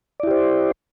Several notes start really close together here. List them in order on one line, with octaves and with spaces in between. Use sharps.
D5 E4 G4 C5